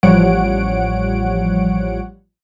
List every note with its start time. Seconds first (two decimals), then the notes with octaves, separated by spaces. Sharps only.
0.03 A1 F3 G3 C#5 F#5 D7